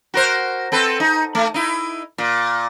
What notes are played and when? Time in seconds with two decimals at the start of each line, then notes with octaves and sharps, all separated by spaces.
0.14 F#4 A#4 C5
0.72 C4 A4 B4
1.00 D#4
1.35 A3
1.54 D#4 E4
2.18 A#2